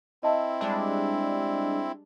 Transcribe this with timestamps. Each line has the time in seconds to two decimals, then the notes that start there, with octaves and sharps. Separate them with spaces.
0.23 C4 E4 D#5 E5 A5
0.61 G3 G#3 D4